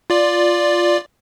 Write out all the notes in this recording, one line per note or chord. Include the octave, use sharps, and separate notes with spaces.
F4 D5